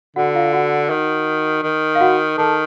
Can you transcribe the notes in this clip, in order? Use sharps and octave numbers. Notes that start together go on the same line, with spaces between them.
D3 F#4 F#5
F4 F5
F#4 F#5
D#3
D#3
F5
F#4 F#5
D#3 A4 A5